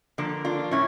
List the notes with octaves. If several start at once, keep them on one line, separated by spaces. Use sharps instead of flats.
D3 F3 A#3
D4 F4
A2 C#4 E4